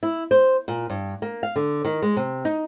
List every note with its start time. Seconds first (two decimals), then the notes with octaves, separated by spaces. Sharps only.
0.03 E4
0.31 C5
0.68 A#2
0.90 G2
1.22 A#3
1.43 F5
1.56 D3
1.85 D#3
2.02 G#3
2.17 C3
2.45 D#4